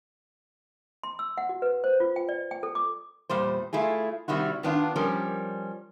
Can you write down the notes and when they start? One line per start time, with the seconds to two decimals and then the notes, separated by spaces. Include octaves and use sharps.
1.04 C6
1.19 E6
1.37 F#5
1.49 F#4
1.62 B4
1.84 C5
2.00 F4
2.16 G5
2.29 D5
2.51 G5
2.63 A4
2.75 D6
3.30 E2 A#2 G3 C5
3.73 A3 E4 F4 G#4
4.28 C3 D#3 G3 E4 F#4
4.63 D#3 B3 D4 F4
4.96 F3 G3 C#4 A#4